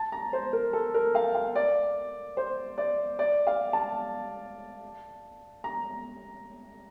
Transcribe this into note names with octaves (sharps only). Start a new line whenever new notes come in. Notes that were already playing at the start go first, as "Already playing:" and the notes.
Already playing: A5
A#5
C5
A#4
A4
A#4
F5
F5
D5
C5
D5
D5
F5
A5
A#5